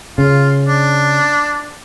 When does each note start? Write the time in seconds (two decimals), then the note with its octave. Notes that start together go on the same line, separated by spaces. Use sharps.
0.18 C#3 F4
0.68 D4